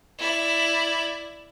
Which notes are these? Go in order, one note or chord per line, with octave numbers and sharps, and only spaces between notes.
E4 D5